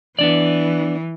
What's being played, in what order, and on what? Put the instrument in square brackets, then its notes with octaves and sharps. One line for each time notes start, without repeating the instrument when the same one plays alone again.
[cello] E3 [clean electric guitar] B3 D4 D5